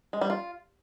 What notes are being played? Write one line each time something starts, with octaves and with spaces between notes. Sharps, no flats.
G#3
G3
F4